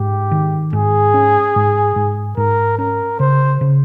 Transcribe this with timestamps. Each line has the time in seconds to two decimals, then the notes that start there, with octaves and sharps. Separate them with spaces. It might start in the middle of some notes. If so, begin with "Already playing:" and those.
Already playing: G#2 G4
0.31 D#3
0.73 G#2 G#4
1.14 C#4
1.56 G#2
1.96 G#2
2.37 G#2 A#4
2.78 C#4 A#4
3.20 C#3 C5
3.61 C#3